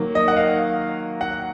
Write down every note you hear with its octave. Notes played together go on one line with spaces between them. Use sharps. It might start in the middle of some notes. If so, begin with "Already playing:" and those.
Already playing: D#3 F#3 A#3
D#5
F#5
F5
F#5